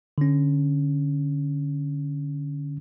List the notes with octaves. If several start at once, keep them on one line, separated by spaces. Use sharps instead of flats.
D3 C#4